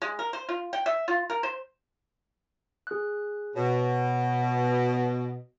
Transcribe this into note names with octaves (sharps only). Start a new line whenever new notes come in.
G#3
A#4
C5
F4
G5
E5
F4
A#4
C5
G#4 F#6
B2 C#5